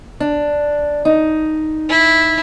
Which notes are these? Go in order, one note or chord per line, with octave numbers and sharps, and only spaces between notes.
D4
D#4
E4